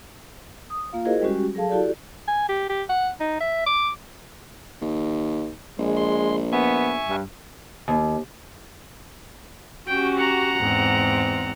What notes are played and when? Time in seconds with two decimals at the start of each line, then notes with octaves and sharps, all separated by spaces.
0.70 D#6
0.93 A#3 F4 F5
1.05 E4 F#4 G#4 A#4 C5 D#5
1.22 G3 G#3 C#4 F#4 G4
1.55 F#3 G#4 A4 F5 A5
1.69 E4 F#4 G4 A4 D5
2.28 G#5
2.49 G4
2.69 G4
2.89 F#5
3.20 D#4
3.41 E5
3.66 D6
4.81 D#2
5.79 A#1 G#3
5.97 C6
6.53 B3 E5 G#5 C#6
7.09 G2
7.88 D#2
9.88 C#4 F#4 G4 G5
10.17 F#5 A#5
10.57 E2 G#2 C4